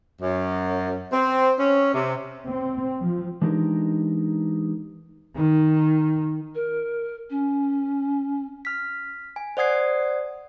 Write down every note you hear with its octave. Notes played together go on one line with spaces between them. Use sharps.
F#2
C4
C#4
C3
C4
F3
E3 G#3 D4 D#4 G4 A#4
D#3
A#4
C#4
F6 B6
G#5
C5 D5 F#5 D#6 G#6 C7